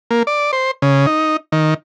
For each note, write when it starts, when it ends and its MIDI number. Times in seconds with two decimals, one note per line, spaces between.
0.11 0.23 58
0.27 0.51 74
0.53 0.71 72
0.82 1.06 49
1.07 1.37 63
1.52 1.74 51